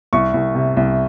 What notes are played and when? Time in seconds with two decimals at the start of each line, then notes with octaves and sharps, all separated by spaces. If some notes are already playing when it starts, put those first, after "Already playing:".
0.13 C2 C#6
0.34 C2
0.55 C3
0.77 C2